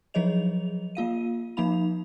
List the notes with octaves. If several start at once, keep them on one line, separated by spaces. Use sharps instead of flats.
F3 F#3 G#4 C#5 D#5 F7
A#3 F4 F5 D#7
F3 A#3 D#4 F5 B5 F7